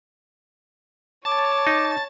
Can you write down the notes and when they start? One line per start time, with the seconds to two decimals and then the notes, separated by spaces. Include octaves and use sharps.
1.25 C#5 A5 D6 A6
1.67 D#4